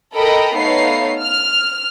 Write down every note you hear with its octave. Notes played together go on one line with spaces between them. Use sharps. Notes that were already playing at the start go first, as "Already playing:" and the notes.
A4 A#4 D#5 G5 A#5 B5
A3 B3 D#4 C#5 F5 C7
F6